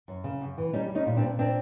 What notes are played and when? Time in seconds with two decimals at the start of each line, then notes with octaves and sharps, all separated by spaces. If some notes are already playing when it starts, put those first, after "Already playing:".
0.08 F#2
0.24 C#3
0.41 F#2
0.58 E3
0.73 G3 C#4 D#4
0.90 G3
0.95 C#4 D#4
1.06 A#2
1.17 C4 D4
1.23 A#2
1.39 C4 D4